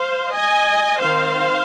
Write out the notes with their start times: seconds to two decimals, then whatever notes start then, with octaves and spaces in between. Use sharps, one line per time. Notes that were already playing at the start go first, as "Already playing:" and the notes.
Already playing: C5 F5
0.32 D#5 G#5
1.00 D#3 C4 C5 F5